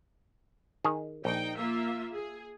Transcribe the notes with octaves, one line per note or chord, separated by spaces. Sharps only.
D#3 G#4
A#1 D#4 G5
A#3 F4 E5
G#4